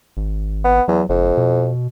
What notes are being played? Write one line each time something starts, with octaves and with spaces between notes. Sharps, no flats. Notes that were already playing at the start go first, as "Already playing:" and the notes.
G#1
B3
E2 F#3
F#1 F2
B2